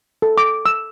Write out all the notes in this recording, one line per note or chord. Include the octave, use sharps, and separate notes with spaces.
A4
D6
E6